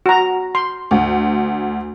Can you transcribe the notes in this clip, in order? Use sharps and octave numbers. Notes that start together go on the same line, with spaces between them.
F#4 A#5
C6
D2